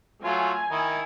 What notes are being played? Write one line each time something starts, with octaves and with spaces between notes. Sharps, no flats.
F#3 A3 F4 G#5
D#3 D#4 E4